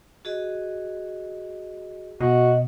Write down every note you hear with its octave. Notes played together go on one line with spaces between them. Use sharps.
F#4 G#4 D#5
B2 F#4 D#5